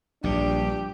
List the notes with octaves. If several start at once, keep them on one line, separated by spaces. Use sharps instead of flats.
A#1 G2 A#2 D4 G4